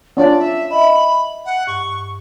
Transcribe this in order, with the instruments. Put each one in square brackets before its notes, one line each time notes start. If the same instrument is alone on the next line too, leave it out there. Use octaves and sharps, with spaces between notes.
[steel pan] C#4 D4 F4 [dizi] D5
[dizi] E5
[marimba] D#5 E5 [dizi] B5
[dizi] F#5
[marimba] G2 [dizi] C#6